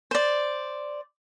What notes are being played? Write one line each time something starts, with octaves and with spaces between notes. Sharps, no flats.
C5 D5